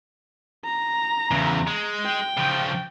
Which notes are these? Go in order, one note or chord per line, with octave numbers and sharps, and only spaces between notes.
A#5
E2 C#3
G#3
G5
C#3 F3